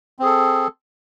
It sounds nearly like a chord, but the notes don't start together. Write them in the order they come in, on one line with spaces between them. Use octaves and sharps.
C4 G#4 A4